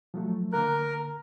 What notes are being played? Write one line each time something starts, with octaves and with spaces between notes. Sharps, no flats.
F3 F#3 A3
D3 A#3 A#4 F#6